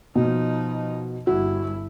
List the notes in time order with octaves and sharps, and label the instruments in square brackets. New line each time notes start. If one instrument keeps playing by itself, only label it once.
[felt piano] B2 [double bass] F3 D#4
[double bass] G1 E4 [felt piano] F#4